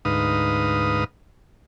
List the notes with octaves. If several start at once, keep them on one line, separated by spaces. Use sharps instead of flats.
D2 G#2 D#4 B4 F5 D#6